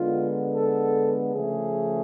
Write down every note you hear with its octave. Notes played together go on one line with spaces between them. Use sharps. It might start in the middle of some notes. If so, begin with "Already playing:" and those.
Already playing: D3 G#3 B3 F4
A4
C#3 F3 A3 G#4